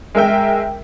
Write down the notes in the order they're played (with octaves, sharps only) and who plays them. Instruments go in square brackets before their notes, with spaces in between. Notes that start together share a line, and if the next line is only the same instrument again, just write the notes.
[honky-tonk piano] G#3 A#4 E5 G5